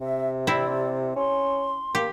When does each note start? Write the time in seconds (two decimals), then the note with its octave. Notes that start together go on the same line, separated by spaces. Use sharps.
0.01 C3 E5
0.47 C4 E4 D5
1.16 C#4 C6
1.95 A#3 G4